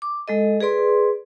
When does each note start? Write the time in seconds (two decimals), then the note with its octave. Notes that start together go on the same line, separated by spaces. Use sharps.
0.02 D6
0.28 G#3 A4 D#5
0.61 G#4 B4 D5 C6